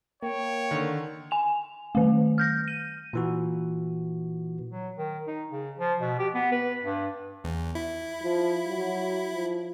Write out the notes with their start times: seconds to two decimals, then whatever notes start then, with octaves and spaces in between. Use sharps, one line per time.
0.23 A#3 C#5 G5
0.71 D3 D#3
1.31 G#5 F7
1.95 D#3 A3
2.38 F6 G6 A#6
2.68 D#7
3.13 A#2 E3 F#4
4.71 F#3
4.98 D#3
5.27 D#4
5.52 C#3
5.79 F3
6.01 B2
6.19 G4
6.35 B3
6.52 B4
6.83 G2
7.44 E2
7.75 E4
8.23 F3
8.67 F#3
9.33 F3